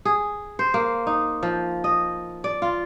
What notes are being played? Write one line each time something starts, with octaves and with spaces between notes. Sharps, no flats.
G#4
C5
A#3
D#4
F3
D#5
D5
F4